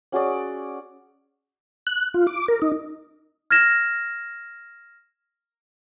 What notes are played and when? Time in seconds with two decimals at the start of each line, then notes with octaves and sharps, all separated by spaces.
0.12 C#4 F#4 G#4 D5
1.87 F#6
2.14 F4
2.27 D6
2.48 A#4
2.62 D#4
3.50 F6 G#6 A#6 E7